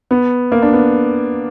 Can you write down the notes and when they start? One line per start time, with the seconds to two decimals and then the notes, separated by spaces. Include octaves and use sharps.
0.11 B3
0.52 A#3
0.62 D4
0.73 B3